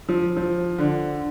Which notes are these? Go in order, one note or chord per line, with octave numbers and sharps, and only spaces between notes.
F3
F3
D3